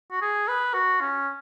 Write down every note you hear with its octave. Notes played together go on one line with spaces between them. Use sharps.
F#4
G#4
B4
F#4
C#4